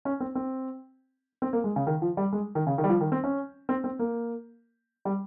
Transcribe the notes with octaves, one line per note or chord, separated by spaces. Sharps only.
C#4
C4
C4
C4
A#3
G#3
C#3
D#3
F3
G3
G#3
D#3
C#3
D#3
G3
F3
D#3
C4
C#4
C4
C4
A#3
G3